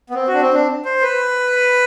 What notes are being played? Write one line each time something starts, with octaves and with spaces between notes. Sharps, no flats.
B3
C4
F#4
D4
C4
D4
C5
B4